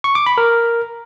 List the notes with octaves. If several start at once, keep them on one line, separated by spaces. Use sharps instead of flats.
C#6
D6
B5
A#4